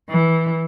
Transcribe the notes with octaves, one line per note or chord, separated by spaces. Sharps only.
E3